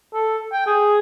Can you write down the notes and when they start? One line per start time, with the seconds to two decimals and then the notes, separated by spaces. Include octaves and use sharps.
0.14 A4
0.52 G5
0.66 G#4